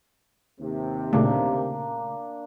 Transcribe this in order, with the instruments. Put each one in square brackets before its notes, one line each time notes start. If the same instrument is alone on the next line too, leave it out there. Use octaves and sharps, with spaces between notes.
[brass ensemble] D#2 C3
[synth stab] A#2 C#3 A3 [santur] A#3 D4